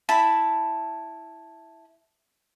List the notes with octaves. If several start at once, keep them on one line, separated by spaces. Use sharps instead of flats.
E4 A5 B5